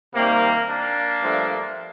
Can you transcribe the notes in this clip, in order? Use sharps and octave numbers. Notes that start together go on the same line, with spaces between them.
C3 D#3 G3 A#3
A#3 D4
G2 F3 A3